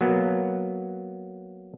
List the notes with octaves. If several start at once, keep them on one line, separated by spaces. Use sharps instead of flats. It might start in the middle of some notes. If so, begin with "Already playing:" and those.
F#3 A#3 B3